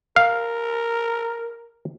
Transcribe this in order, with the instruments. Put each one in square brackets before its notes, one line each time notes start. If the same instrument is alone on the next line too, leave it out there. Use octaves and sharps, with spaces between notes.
[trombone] A#4 [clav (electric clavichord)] F5